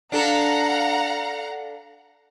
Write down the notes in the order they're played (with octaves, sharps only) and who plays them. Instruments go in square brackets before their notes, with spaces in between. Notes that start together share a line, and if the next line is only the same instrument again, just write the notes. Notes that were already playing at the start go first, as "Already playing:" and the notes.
[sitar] D4 A4 [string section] F5 F#5 A#5